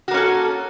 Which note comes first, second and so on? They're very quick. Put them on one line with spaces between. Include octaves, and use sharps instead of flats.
F#4 A#3 C#4 A4